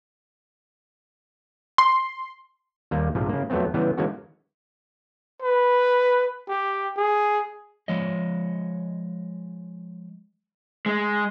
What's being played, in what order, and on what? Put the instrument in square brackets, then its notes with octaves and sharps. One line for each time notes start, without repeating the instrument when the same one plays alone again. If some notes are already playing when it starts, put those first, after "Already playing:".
[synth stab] C6
[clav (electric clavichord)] D#2 G3 A#3
A#1 G#2 C3 F3
C#3 A#3
F2 F#3 A3 B3 C4
C#3 E3 G3 B3
E3 G#3 A#3 C#4 F#4
[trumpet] B4
G4
G#4
[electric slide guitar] F3 G#3 C#5 D#5
[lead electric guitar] G#3